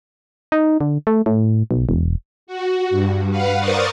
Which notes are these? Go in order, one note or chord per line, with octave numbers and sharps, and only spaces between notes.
D#4
D3
A3
A2
B1
E1
F#4
G2
B4 F5 F#5
A#4 C5 D5 C#6 D#6 A6